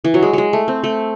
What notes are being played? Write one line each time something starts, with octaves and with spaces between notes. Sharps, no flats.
E3
F#3
G#3
F#3 G#3
A3
C4
A3